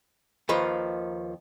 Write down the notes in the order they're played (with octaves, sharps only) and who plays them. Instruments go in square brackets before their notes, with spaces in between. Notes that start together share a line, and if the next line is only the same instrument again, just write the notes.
[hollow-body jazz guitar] D#2 D#3 F3 B4